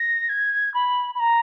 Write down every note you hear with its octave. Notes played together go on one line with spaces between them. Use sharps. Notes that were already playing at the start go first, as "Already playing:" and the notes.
Already playing: A#6
G#6
B5
B5
A#5